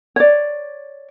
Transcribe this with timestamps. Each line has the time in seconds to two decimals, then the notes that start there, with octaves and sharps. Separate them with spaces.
0.16 C#5 D5